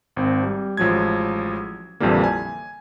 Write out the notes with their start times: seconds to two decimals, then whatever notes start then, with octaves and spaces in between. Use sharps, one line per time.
0.16 G#1 C4
0.43 G3
0.77 A1 F3 F#3 G#3 G#6
2.00 A#1 F2 D3 E3 G3 A#3
2.24 G#5